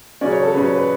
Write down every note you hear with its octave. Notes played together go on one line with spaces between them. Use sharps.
C#3 F#3 C#4 D5
C#5
A4
C#3 F#3 C#4 B4
C#5
B4